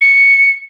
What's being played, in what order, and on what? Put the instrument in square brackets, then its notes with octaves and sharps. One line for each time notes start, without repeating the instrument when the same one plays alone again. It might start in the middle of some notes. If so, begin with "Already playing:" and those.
[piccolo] C#7